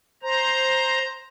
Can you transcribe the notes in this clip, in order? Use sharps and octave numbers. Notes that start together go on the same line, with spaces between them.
C5 A#5